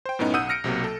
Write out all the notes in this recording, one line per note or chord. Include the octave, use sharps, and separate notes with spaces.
C5 G5
F#2 A2 B3 C#4 D#4
B1 F#5 D#6 E6 G6 D#7
F6 A#6 C#7 D7
B1 C3 F#3 A#3
A4